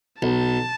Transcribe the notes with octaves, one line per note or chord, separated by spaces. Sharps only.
B1 A5